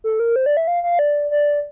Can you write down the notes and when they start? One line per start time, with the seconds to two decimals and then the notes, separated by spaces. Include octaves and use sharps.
0.04 A4
0.20 A#4
0.36 C5
0.46 D5
0.57 E5
0.68 F5
0.83 F5
0.99 D5
1.31 D5